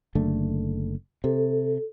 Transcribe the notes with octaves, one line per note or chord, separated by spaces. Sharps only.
F#1 D3 A3
C3 A4